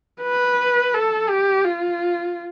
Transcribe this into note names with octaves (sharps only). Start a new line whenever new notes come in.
B4
A4
G4
F4